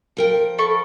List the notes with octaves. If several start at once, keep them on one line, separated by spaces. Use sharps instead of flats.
F3 A#4 G5
A4 B5 C#6